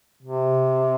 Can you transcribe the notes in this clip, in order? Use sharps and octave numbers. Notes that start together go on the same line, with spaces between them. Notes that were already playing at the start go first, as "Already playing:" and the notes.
C3